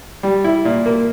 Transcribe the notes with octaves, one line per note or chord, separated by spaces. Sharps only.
G3
E4
A#2
A#3